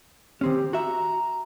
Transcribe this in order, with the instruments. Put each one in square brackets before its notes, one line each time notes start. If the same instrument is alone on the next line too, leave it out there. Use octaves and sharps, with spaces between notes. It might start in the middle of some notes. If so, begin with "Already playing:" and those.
[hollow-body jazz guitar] D#3 C4 C#4 [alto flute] G4
[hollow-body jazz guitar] F#4 E5 [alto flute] A#5